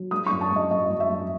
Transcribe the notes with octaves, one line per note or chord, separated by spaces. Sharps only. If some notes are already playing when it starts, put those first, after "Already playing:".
Already playing: F#3
G#3 D#6
F#2 C#6
A5
G#3 D#5
F#2 D#5
F#2
E5
F#2